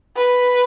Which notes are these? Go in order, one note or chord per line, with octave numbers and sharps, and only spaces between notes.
B4